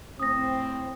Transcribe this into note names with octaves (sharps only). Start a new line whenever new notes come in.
A2 C4 D#6 A#6